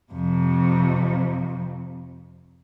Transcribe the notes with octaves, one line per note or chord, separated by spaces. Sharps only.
F2 C3